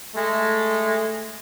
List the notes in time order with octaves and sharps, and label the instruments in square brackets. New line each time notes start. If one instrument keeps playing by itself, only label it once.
[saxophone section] G#3 A3